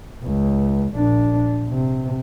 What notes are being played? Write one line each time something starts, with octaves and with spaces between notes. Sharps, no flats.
C#2
A#1 D4
C3